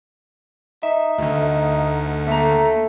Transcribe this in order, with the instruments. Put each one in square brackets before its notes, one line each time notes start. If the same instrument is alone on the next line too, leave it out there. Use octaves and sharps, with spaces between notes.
[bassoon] D#4 [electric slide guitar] E5
[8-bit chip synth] D2 D3
[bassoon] A3 [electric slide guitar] A#3 A#5